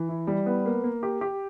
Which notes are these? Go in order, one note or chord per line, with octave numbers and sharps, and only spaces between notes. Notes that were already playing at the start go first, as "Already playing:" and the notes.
Already playing: E3
E4
G3
B3
A#3
A#3
G4
G4